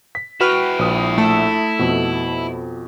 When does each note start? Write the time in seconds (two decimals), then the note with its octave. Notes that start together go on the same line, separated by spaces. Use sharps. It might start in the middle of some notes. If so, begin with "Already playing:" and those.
0.15 B6
0.41 E4 F#4 B4 G5 F6
0.79 A#1 D#6
1.18 A3 A4
1.79 F2 B2